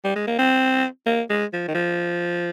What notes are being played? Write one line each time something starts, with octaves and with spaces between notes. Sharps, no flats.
G3
G#3
A#3
C4
A#3
G#3
F3
D#3
F3